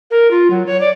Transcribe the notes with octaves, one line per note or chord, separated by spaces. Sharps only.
A#4
F4
F#3
C#5
D5